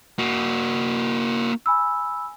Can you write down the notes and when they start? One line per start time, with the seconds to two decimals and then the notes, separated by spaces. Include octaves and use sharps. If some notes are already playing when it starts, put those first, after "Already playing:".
0.18 A#3 F#4
1.66 G#5 B5 E6